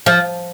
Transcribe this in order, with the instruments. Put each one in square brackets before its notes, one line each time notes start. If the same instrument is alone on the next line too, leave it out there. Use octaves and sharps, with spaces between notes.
[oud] F3